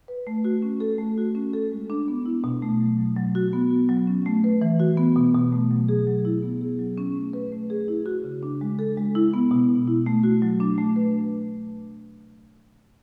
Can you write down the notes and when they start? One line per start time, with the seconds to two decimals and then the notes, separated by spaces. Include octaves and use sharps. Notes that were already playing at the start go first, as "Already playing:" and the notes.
0.08 B4
0.27 A3
0.45 F#4
0.62 C#4
0.80 A4
0.98 A3
1.18 F#4
1.35 C#4
1.53 A4
1.72 G#3
1.90 D4
2.08 B3
2.26 E4
2.44 B2
2.62 A3
2.80 F#3
2.98 F#3
3.16 F#3
3.35 F#4
3.53 B3
3.70 F#4
3.89 F#3
4.07 C#4
4.26 A3
4.44 B4
4.61 E3
4.80 F#4
4.97 B3
5.16 B2
5.35 B2
5.52 A3
5.71 F#3
5.89 G#4
6.07 F#3
6.25 E4
6.43 B3
6.61 G#4
6.79 F#3
6.98 C#4
7.16 A3
7.33 B4
7.52 A3
7.70 G#4
7.88 E4
8.06 F#4
8.24 C#3
8.43 D4
8.61 G#3
8.79 A4
8.98 G#3
9.15 E4
9.34 B3
9.51 B2
9.69 B2
9.87 E4
10.06 A3
10.23 F#4
10.42 F#3
10.60 D4
10.78 A3
10.96 B4